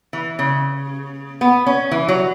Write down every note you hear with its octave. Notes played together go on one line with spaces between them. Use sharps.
E3
C#3
B3
C#4
E3
F#3